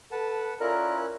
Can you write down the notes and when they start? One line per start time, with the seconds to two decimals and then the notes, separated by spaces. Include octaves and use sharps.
0.12 A4 B4 F#5 A5
0.61 C#4 E4 F4 A#4 D5 F#6